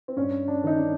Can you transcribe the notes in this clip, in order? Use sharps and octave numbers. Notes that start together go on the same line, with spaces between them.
C4
G2 C#4
D4
D#3 D#4
D4